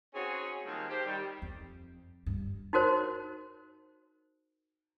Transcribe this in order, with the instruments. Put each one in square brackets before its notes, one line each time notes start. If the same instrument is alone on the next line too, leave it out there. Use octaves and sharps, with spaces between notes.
[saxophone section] C4 C#4 D#4 F#4 G#4 C#5
D#3 F3 G3 G#3 A#3 C4
G4 C5
D#3 G3
[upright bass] F2
G2
[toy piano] D#4 F#4 A#4 C5